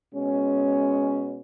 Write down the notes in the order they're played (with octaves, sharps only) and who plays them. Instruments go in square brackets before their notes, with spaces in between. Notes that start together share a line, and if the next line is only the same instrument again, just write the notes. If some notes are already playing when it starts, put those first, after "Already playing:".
[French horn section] B2 G#3 C#4